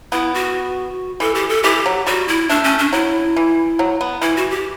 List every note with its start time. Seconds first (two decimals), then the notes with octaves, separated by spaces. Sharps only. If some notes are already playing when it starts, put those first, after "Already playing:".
0.12 B3 E4
0.34 F#4
1.20 E3 A4
1.35 G4
1.49 A4
1.63 E3 G4
1.86 F#3
2.06 G3 F#4
2.28 E4
2.49 A3 D4
2.64 C#4
2.79 D4
2.93 F#3 E4
3.36 E3
3.79 F#3
4.01 B3
4.21 E3 E4
4.36 F#4
4.51 G4